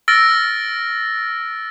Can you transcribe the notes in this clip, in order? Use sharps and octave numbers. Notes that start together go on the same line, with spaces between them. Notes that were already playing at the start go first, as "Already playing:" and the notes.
E6 F6 A6 A#6 D7